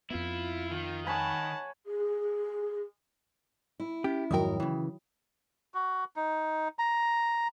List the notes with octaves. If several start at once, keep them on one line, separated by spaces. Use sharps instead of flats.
F2 B3 E4 F4
D#3
C#5 F#5 G#5 A5 B5
G#4
E4
C#4 G4
F2 G#2 D#3 F#3 A#4 G5 D#6
C#3 E3
F#4
D#4
A#5